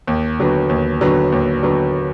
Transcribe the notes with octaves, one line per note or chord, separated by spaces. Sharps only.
D#2
D3 F#3 B3
D#2
D3 F#3 B3
D#2
D3 F#3 B3